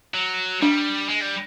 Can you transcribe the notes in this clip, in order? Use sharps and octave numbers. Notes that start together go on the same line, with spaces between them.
F#3
G3 D4
G#3
G3